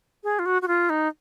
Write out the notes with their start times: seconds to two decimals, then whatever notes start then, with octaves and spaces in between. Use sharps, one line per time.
0.24 G#4
0.39 F4
0.46 F#4
0.62 F#4
0.68 F4
0.90 D#4